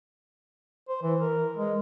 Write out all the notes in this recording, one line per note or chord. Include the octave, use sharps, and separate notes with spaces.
C5
E3
A#4
G#3